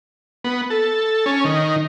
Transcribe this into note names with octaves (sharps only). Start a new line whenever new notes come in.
B3
A4
C#4
D#3